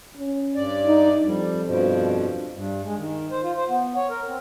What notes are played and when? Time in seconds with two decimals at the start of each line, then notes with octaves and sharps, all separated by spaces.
0.18 C#4
0.55 G2 D5
0.86 D#4
1.24 F2 G3
1.66 G2 B2 F3
2.52 G2
2.83 G#3
2.96 D#3
3.31 C5
3.43 F4
3.57 C5
3.68 B3
3.96 C#5
4.10 A#4
4.26 C4